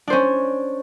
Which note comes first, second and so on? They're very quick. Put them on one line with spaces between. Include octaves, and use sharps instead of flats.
D4 C5 C#4